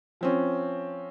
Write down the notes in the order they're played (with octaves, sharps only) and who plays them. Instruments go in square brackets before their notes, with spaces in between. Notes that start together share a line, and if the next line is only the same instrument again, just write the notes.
[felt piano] F3 C4 C#4